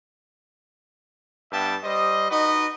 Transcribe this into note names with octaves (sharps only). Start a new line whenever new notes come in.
G2 B3 E5 G5 A5
G3 C5 D#5
D#4 F#4 B4 D#5